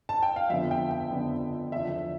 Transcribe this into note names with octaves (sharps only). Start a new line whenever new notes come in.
A5
G5
F5
F2 D3 F3 B3 E5
G5
G5
F2 D3 F3 B3
E2 D3 F3 C4 E5